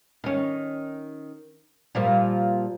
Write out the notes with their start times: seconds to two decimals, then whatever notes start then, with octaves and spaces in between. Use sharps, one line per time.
0.24 D#3 C#4
1.95 A#2 F3 G3